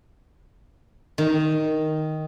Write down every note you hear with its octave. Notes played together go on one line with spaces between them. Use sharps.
D#3